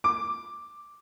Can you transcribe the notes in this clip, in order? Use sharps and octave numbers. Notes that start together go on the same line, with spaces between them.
D6